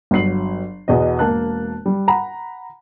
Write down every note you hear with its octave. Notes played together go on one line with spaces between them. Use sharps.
G1 F#3 C7 F#7
E2 B2 B3 D#5
E1 A#3 A5 F#6
G3
F#5 A#5 B5